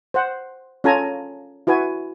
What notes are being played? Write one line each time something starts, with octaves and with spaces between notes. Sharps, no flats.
C5 F#5
C#4 F4 A4 G#5 A#5
E4 F#4 B4 G#5